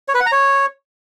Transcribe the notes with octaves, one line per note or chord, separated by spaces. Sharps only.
C#5
B4
F#5
A#5
C#5